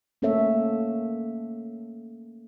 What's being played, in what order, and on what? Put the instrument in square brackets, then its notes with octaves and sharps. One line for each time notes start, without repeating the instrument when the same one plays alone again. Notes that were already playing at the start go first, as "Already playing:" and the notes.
[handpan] A3 A#3 C#4 A4 C#5 E5